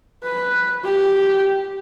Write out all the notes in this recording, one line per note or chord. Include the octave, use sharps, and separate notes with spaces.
B4
G4